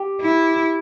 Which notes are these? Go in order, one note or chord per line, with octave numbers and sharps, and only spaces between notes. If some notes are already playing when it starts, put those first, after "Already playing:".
Already playing: G4
E4